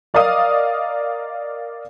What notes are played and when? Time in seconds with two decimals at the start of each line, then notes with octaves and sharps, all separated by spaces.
0.14 A#4 D5 D#5 F5 D#6